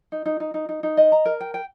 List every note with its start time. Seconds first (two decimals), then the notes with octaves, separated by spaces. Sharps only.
0.12 D#4
0.26 D#4
0.40 D#4
0.54 D#4
0.69 D#4
0.83 D#4
0.97 D#5
1.12 A#5
1.25 A#4
1.41 G5
1.54 G5